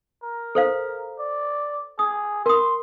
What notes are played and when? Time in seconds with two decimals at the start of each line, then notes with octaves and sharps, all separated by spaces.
0.23 A#4
0.55 A4 C5 F5
1.19 D5
1.99 G#4 D#6
2.46 A#4 C6 D#6